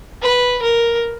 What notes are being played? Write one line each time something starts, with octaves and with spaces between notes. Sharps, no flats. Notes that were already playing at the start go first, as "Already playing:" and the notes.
B4
A#4